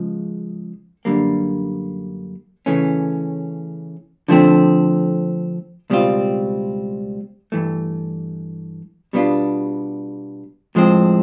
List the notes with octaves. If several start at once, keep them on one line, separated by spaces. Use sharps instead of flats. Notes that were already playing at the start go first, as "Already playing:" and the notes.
Already playing: C#3 F3 G#3
F#2 D3 G3 A#3
C#3 E3 A3 C#4
D3 F3 A3 C4
C#2 B2 G3 C4 F4
G2 E3 A3
B2 G3 B3 D4 F4
A2 F3 G#3 C4